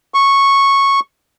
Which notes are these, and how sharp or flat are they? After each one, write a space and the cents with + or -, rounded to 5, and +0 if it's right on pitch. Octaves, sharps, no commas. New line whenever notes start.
C#6 -10